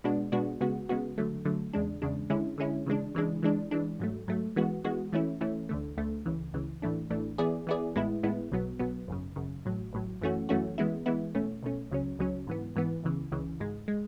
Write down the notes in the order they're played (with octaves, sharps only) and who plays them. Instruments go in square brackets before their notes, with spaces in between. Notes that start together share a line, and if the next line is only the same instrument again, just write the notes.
[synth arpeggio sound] B2 G#3 B3 D4 F#4
B2 G#3 B3 D4 F#4
C#3 G#3 B3 F#4
C#3 G#3 B3 F#4
D3 F#3 A3
D3 F#3 A3
E2 C#3 G#3 D4
E2 C#3 G#3 D4
D3 G#3 C#4 E4
D3 G#3 C#4 E4
C#3 E3 G#3 D4
C#3 E3 G#3 D4
E3 G#3 D4
E3 G#3 D4
G#2 F#3 A3
G#2 F#3 A3
E3 G#3 B3 F#4
E3 G#3 B3 F#4
E3 A3 C#4 E4
E3 A3 C#4 E4
D2 D3 A3
D2 D3 A3
C#2 C#3 E3
C#2 C#3 E3
A1 A2 E3 A3 D4
A1 A2 E3 A3 D4
E3 B3 E4 G#4 D5
E3 B3 E4 G#4 D5
A1 A2 G#3 B3 E4
A1 A2 G#3 B3 E4
B1 B2 F#3 B3
B1 B2 F#3 B3
G#1 F#2 C#3
G#1 F#2 C#3
A1 A2 F#3
A1 A2 F#3
F#2 E3 A3 C#4 F#4
F#2 E3 A3 C#4 F#4
E3 G#3 B3 E4
E3 G#3 B3 E4
B1 B2 A3 C#4
B1 B2 A3 C#4
C#2 C#3 F#3 C#4
C#2 C#3 F#3 C#4
G#2 E3 B3
G#2 E3 B3
C#2 C#3 E3
C#2 C#3 E3
G#1 G#2 G#3
G#3